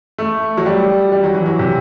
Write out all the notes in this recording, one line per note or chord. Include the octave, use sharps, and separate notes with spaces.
A3
F#3
G3
G3
F#3
E3
F#3
C3